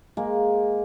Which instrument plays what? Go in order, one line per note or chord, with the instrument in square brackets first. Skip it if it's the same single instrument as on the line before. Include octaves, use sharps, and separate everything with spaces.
[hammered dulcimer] G#3 A#3